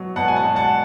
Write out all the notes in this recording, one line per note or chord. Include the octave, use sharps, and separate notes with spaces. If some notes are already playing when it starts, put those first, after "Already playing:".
Already playing: B2 F#3
B2 F#5 A5
G#5
F#5 A5
B2
F#5 A5